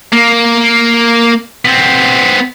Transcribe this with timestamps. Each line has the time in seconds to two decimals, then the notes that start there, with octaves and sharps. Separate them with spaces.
0.12 A#3
1.65 B3 C4